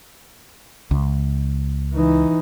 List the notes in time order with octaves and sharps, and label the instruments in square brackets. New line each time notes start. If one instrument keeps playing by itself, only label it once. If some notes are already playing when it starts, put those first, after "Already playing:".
[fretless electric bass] C#2
[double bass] E3 D#4